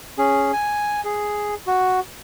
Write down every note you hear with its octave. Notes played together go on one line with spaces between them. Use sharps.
C#4 G#4
G#5
G#4
F#4